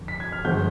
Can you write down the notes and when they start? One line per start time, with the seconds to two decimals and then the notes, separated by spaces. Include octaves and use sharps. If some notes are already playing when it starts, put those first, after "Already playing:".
Already playing: G1 F2
0.08 B6
0.20 G#6
0.32 F6
0.45 G1 F3 G#3 G6